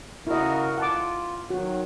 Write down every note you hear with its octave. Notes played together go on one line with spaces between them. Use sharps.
C#3 E4 F#4 A#4 D#5
F4 F#5 A5 D6
D#3 F#3 F#4